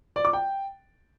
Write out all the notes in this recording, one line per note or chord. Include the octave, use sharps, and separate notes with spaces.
D5
D6
G5